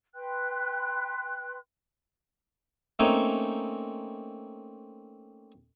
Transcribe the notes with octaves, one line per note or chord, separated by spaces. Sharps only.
B4 G5 C6 F#6
A3 A#3 C4 C#4 D#4 G#5